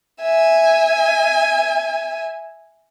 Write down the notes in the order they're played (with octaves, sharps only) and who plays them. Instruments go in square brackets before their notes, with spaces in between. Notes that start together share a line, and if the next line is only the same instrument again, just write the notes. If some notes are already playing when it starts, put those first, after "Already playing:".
[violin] E5 G#5